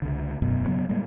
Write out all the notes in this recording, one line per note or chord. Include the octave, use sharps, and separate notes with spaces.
C#2 D3
E1 F#2 B2
C#3 F#3 B3
A2 G3 G#3 A#3